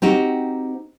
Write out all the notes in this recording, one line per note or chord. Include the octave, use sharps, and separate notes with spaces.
C4 D#4 F#4 G4